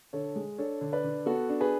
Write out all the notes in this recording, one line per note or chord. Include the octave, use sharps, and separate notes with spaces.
D3 A4 C#5
G#3
D4 A4 C#5
D3
B4 D5
D3
B3 F#4 A4
D4
G#4 B4